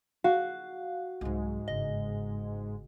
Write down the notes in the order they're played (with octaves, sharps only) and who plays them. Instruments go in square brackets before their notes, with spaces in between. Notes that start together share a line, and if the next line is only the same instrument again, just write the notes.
[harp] F#4 [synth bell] F5
[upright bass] C2 F#3 [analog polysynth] G#2 G#3
[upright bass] G1 C#3 [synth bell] D#5